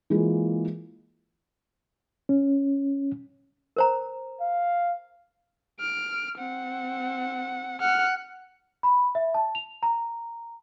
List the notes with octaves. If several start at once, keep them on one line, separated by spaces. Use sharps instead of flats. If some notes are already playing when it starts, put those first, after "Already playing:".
E3 G#3 A#3 F4 G#4
C#4
A#4 C5 A#5
F5
F6 D7
C4 F#5
F#5 F6
B5
E5
A5
F7
A#5